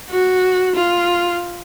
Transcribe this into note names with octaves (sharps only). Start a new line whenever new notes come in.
F#4
F4